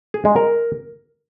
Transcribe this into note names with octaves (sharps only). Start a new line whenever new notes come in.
G#4
G#3
A#4